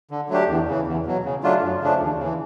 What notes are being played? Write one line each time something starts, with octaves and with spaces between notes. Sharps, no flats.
D3
F#3 A3 D4 G4
E2
C#3 E3
E2
B2 F#3
C#3
F#3 A3 D4 F4
F#2
C#3 F3 A3 D4
D#2
C#3 E3